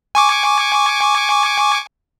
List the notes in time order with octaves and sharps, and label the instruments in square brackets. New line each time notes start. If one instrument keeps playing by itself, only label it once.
[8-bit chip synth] G#5 C#6 D6